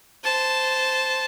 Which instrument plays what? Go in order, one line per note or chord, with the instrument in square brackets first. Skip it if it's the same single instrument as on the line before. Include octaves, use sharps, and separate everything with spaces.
[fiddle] C5 A5